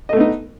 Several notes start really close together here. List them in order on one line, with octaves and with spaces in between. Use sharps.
D#5 A3 B3 D#4